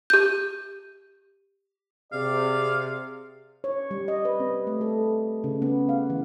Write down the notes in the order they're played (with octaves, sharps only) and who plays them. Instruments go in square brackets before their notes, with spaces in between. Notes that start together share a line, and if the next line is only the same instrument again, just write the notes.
[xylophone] G4 G6
[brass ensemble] C3 [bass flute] G#4 [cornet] D5 [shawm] F5
[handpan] C#5
G3
D#5
B4
C4
A3
A4
C#3
B3
F5
E3